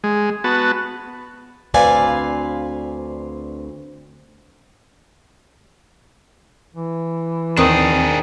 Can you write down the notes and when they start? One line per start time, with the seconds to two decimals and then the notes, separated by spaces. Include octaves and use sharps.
0.04 G#3
0.44 B3 F#4 A5
1.74 D2 C4 B4 D5 F5 G#5
6.75 E3
7.57 D#2 D#3 C4 D4 G#4 D#6